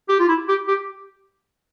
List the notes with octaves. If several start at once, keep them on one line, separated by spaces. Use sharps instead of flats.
G4
F4
E4
G4
G4